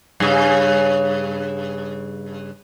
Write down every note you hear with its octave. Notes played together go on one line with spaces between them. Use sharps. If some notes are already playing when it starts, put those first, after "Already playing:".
G2 C#3